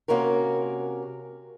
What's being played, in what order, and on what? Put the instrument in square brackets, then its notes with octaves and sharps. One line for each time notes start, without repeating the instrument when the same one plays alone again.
[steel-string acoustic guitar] C3 A#3 C#4 F#4 A#4